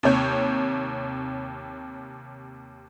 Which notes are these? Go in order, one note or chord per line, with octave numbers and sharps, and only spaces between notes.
D#2 C3 C#5 G6